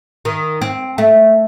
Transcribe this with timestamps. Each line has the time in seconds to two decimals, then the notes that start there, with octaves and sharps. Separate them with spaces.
0.25 D#3
0.61 C4
0.98 A3